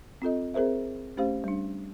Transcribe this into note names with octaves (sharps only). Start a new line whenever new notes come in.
C4 F4 A4 D#5
C4 G#4 A#4 C5 E5
A3 C#4 G4 C5 F5
G3 D4